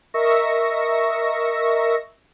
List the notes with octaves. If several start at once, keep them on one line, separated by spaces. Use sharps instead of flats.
A#4 D#5 E5 C#6 E6 A#6